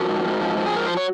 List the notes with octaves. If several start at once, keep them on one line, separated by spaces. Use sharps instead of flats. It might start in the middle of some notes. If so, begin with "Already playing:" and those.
Already playing: F3 F#4 A#4
G#2
G#2
F3
F3
G#4
G#2 A#4
C5
C#5